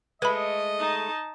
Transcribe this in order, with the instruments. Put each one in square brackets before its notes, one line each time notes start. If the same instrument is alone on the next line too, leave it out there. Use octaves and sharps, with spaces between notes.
[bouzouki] G#3 A3 [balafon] B4 B5 [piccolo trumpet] D#5
[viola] D#4 A5